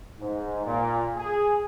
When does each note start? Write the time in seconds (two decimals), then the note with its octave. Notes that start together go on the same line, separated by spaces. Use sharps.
0.20 G#2
0.64 A#2
1.17 G#4